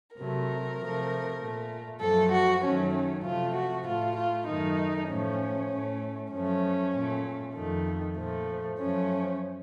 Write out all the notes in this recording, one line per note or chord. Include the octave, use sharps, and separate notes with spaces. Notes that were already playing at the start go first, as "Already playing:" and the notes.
C3 F#3 A3 A#4
C3 F3 A3
A#2 A3
F#2 F3 A3 A4
F#4
F#2 D#3 F#3 A3 C#4
C#4
C3 F3 A3 F4
F#4
A2 A3 F4
F4
F#2 D#3 A3 D#4
A2 F3 A3 C#4
A2 A3
F#2 F3 A3 C#4
A#2 A3
F2 D#3 A3
A#2 F3 A3
F#2 F3 A3 C#4